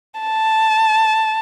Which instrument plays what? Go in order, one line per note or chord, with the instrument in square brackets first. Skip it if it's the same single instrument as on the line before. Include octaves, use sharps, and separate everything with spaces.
[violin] A5